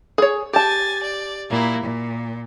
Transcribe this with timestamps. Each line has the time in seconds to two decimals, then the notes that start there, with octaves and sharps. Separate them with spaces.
0.18 G#4 C#5
0.53 G4 G#5 A5 A6
1.02 D5
1.49 A#2 A#3 E4
1.82 A#2